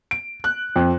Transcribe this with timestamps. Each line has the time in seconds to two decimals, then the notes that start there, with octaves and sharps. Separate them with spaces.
0.11 D7
0.44 F#6
0.76 F2